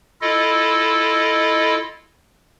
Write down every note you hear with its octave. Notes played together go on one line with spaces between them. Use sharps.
E4 F4 A4 D#5